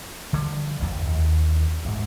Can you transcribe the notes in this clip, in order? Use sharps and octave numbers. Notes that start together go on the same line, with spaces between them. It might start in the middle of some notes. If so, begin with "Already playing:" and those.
D3 F3 G3
A1 F2
D#2
D2 G#2